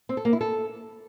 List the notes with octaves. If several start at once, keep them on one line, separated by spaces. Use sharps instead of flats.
C4
A4
A#3
E4
A4